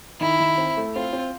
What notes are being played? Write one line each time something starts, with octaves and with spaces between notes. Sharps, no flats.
D#3 E4
D#3
C4
A3
C4 F4
C4